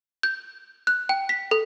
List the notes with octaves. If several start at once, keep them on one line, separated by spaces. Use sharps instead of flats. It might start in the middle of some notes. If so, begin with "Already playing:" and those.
G6
F#6
G5
B6
A4